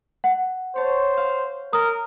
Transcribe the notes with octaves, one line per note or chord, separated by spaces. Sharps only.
F#5
C5 C#5 A5
F5
A#4 D#6